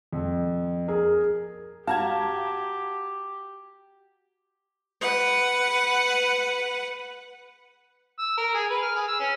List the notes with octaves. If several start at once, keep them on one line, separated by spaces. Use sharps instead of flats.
F2
G#4 A#4
F#4 G4 F5 A5 A#5 G#6
B4 F#5
E6
A#4
G#4
B4
F6
G#4
E6
C#4